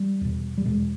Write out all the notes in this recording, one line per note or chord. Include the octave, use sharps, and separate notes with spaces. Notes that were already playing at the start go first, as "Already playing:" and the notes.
Already playing: G3
E2 B2
G3
E2 B2 G#3